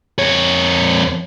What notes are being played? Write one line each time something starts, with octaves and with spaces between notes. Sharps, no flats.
F2 C#5